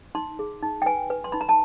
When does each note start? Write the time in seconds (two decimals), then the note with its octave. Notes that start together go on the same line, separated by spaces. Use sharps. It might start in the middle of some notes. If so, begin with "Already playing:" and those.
0.15 D#4 C6
0.39 G#4
0.63 D#4
0.82 G5
0.86 B4 G#5
1.10 B4
1.24 C6
1.32 D#4 B5
1.41 A#5
1.49 A5